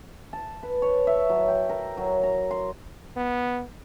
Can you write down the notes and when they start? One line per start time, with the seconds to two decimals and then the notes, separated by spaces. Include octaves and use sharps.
0.33 A5
0.63 B4
0.82 C#5
1.07 E5
1.29 F#3
1.48 G5
1.69 A#4
1.97 F#3
2.23 A#5
2.51 C6
3.16 B3